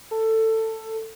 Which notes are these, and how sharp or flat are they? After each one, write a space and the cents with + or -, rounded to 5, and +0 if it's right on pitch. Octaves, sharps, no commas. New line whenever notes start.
A4 +15